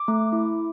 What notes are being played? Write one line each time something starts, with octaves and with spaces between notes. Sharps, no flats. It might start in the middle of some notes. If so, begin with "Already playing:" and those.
Already playing: D6
A3
E4